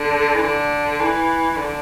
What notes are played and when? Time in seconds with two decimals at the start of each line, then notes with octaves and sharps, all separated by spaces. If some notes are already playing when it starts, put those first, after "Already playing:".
Already playing: D3
0.35 E3
0.43 D3
1.00 E3
1.56 D3